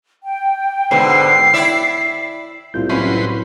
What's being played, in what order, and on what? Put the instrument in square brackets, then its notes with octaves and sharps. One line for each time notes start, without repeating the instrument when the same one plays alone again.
[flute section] G5
[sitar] G#2 B2 D3 [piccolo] C7
[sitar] E4 D5 E5
[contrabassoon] C2 [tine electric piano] A2 F4 G6
[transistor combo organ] F#3 B4 C6 [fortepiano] C#4 E4